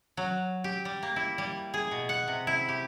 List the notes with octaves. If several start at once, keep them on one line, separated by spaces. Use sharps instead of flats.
F#3
G4
G3
A#3
E4
G3
G#4
B2
F#5
C3
E4
G4